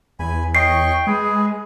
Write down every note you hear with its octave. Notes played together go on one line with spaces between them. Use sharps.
E2 G#5 B5
C#5 D#5 G5 C#6 C7
G#3 G#4 B4